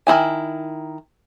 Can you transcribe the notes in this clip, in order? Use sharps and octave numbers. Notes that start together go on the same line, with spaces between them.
D#3 D#4 E4 G#5